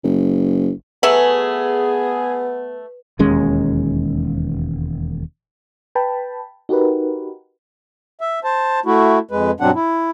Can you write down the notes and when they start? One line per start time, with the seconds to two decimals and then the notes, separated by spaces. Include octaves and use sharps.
0.04 F#1
1.03 F#3 A3 B3 G#4 B4 E5
3.19 E1 D#2 G#3 C#4
5.95 B4 G5 A5 B5
6.69 D#4 F#4 G4 A#4 B4
8.21 E5
8.44 C5 A5
8.86 A3 E4 F#4
9.31 F2 G#3 B4
9.60 G2 B2 F#3 C4 D4 F#5
9.75 E4